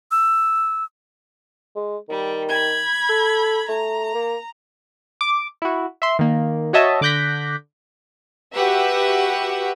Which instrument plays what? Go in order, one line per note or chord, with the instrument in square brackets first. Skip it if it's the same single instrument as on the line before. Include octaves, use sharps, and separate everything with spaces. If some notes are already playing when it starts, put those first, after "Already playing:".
[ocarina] E6
[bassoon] G#3
[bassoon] D#3 [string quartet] G3
[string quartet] B5 G#6
[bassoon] A4
[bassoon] A3 [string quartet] A#5
[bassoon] A#3
[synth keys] D6
E4 F#4
E5 C6
D#3 A#3
F#4 C#5 D#5 E5 A5
D3 D6 F#6 G6 A#6 B6
[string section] F#4 G4 B4 E5 F#5